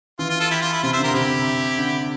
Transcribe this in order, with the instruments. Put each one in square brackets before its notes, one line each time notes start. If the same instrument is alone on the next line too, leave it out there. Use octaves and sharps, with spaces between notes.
[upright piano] E3 [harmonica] F4
[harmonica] F4
F4 A4
E4 G4
F4
E4
[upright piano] C3 [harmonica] F4
[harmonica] C5 E5
[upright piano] D3 [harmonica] G4 A#4
[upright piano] C3 [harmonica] E4 G4
[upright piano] D3